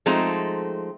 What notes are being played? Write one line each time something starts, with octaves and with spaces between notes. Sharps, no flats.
F3 G#3 A3 C4 D#4 A#5